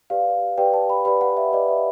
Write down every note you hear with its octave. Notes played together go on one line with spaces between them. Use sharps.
G4 B4 D5 F5
G4 B4 D5 G5
A5
B5
G4 B4 D5 B5
F#5
E5
G4 B4 D5 D#5
E5